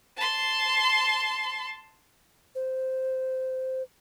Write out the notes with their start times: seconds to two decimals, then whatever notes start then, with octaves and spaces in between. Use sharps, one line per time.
0.17 A5 C6
2.55 C5